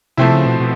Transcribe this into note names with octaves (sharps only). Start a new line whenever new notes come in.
C3 F3 A3 C4 E4
C#3
B2
B2